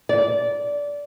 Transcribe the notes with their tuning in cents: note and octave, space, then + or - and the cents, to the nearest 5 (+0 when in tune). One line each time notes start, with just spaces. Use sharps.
D5 -20